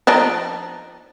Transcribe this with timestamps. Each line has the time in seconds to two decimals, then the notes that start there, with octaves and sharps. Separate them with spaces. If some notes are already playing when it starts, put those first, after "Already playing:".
0.07 F3 D4 D#4